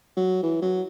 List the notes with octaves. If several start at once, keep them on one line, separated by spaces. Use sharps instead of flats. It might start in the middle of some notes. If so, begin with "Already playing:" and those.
F#3
E3
F#3